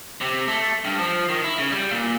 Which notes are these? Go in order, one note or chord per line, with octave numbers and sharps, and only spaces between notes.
C3
A3
G2
F3
D#3
E4
C#3
G3
A#2